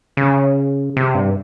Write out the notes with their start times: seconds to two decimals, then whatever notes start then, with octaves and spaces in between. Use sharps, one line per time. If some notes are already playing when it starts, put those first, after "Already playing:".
0.17 C#3
0.97 C3
1.15 G2